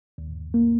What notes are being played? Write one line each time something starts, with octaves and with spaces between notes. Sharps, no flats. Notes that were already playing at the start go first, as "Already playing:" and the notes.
D#2
A#3